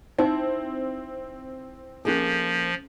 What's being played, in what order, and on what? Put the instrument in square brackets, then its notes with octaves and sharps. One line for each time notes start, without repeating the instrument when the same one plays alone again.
[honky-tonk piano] C4 [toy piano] D#4 [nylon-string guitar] E4
[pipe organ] F3 [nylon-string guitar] A#3 D#4 G#4 [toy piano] C#4 A4